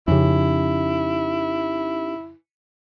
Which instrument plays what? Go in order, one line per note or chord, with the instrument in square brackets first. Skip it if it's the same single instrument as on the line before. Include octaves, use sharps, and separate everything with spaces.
[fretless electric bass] F2 C#3 [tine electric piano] C#4 D#4 G4 [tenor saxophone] E4